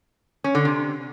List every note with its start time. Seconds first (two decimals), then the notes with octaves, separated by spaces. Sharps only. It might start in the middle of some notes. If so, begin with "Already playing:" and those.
0.44 C#4
0.55 D3
0.65 C3